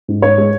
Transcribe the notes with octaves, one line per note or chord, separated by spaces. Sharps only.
G#2
G#2 C#5
G#3